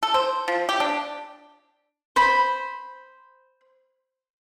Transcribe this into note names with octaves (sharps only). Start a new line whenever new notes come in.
A4
C5
F3
G4
D4
C5 B5